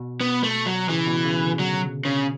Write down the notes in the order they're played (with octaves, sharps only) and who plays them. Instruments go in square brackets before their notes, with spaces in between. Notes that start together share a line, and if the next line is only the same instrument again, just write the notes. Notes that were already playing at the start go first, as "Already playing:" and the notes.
Already playing: [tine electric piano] B2
[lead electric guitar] B3
A3
F#3
[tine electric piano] C#3 [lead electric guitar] E3
[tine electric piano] B2
C#3
D3
[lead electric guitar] F#3
C#3